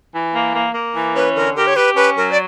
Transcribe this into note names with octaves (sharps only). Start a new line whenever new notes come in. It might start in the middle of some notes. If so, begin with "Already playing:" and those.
E3
A#3
A#3
A#3
E3
C#4 B4
D3 A#4
G4 A#4
C#5
G4 B4
C#4 B4
F#3 A#4
D5